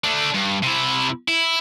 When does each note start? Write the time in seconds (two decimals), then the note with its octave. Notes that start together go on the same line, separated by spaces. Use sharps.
0.04 A3 D4
0.34 G2
0.63 C3 E4
1.28 E4